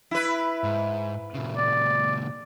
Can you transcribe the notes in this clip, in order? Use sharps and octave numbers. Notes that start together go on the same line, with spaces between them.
E4 B4
G#2
A#2 C#3
D5